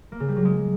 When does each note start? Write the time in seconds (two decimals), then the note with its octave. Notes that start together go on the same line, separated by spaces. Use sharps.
0.12 A#3
0.20 C#3
0.28 G3
0.37 F#3
0.45 G#3